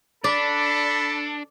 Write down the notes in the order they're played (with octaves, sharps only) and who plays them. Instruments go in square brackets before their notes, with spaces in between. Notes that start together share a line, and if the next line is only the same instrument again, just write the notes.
[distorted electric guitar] D4 [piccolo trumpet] A4 [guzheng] D5 [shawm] B5